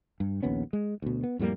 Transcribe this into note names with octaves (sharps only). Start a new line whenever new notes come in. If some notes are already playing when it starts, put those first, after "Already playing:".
G2
A#1 D#2 B3 C#4
G#3
D2 B2
B3
F2 A2 G3 A#3